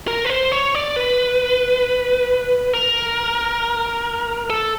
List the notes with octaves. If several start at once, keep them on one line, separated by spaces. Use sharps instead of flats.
A#4
B4
C5
C#5
D5
B4
A#4
A4